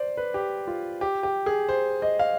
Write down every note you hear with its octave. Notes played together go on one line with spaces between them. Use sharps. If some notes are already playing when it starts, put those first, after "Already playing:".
Already playing: C5 D5
B4
G4
F4
G4
G4
G#4
C5
D#5
F5